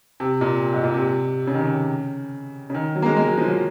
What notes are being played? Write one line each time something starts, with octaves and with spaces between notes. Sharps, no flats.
C3
A#2
G#2
A#2
C3
C#3
D#3
C#3
C#3
D#3
F#3
A#3
G#3
G#3
F#3
F3
F#3